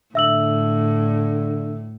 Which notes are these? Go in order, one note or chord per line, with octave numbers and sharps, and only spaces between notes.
A2 D3 E5 E6 F#7